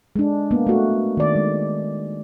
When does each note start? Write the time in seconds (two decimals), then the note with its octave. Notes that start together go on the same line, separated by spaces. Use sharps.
0.16 G#3 D4
0.51 A#3 B3
0.67 A3 F#4
1.17 D#3 D5
1.36 G#3